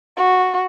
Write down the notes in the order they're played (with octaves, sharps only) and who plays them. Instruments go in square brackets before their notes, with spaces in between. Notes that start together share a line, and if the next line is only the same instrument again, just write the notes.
[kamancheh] F#4